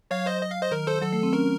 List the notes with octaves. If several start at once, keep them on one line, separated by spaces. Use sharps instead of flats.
F#3 C#5 F5
C5 D#5
D#5
F5
C5 D#5
D#3 A#4
A4 C5
F#3 A4
A3
C4
C#4 A#4